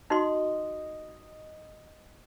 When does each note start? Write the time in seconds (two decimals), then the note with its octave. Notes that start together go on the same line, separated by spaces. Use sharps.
0.10 D#4 F#4 D#5 C6